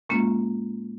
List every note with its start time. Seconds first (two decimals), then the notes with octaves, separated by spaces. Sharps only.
0.09 A2 G#3 A#3 C#4 F4